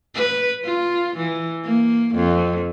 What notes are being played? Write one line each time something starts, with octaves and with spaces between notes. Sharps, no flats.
B4
F4
E3
A#3
F2